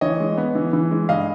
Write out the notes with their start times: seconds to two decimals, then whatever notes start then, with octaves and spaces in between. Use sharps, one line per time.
0.01 E3 C#5 D#5
0.20 G#3
0.38 B3
0.55 E3
0.73 E3
0.91 G#3
1.09 G2 D#5 F5